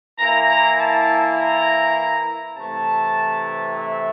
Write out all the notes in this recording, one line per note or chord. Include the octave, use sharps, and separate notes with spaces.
E3 A#3 E4 A#5
A#5
A5
A#5
C3 E3 A3 A5
E5